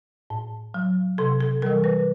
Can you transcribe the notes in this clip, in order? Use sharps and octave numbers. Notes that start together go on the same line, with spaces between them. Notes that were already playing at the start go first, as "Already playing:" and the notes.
A2
F#3
C3 A4
A4
E3 G3 A#4
B4